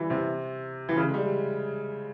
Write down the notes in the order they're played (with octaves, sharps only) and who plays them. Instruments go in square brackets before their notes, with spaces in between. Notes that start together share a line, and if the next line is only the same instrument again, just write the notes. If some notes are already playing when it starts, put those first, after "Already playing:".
Already playing: [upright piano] E3 G3
C3
E3
C#3
G#3
G3